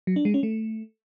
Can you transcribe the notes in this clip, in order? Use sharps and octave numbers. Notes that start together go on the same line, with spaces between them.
F#3
D4
G#3
C#4
A3